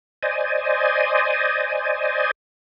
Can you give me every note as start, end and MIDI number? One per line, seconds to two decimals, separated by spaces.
0.23 2.31 72
0.23 2.31 74
0.23 2.31 75
0.23 2.31 80